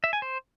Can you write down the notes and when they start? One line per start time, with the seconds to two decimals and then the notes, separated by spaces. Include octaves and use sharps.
0.04 E5
0.13 G#5
0.22 C5